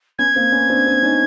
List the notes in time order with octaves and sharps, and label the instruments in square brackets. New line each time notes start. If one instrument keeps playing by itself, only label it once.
[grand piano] B3 C#4 [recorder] G#6
[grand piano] A#3 C4
B3 C#4
C4 D4
C4 D4
C#4 D#4